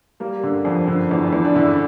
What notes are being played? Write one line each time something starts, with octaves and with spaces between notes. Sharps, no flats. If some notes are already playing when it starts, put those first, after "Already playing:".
G3 A#3
D3
F2
D3
E2
E2
D4
D3 E4